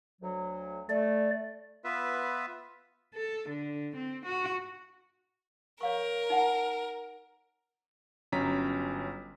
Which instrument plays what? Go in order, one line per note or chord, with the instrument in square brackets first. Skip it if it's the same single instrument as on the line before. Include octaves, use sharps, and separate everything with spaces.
[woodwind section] D2 F#3
[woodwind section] A3 [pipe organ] D5
[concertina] B3 F4 B4 E5
[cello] A4
D3
C4
F#4
[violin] A#4 [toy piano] C#5 F5 C#6
[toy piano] D#4 F#5 G#5
[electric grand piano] G1 F#3 C#4 A#5 B6